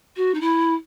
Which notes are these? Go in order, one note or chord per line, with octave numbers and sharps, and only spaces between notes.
F#4
D#4
E4